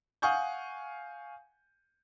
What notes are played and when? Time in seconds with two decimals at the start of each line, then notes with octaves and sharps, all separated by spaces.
0.22 F5 F#5 G#5 C#6 D#6 G6